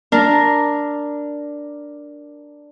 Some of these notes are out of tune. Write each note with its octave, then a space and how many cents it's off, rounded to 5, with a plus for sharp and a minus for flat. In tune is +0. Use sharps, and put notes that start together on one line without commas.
D4 +0 A#4 +0